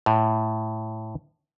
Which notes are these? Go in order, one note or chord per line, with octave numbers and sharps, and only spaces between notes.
A2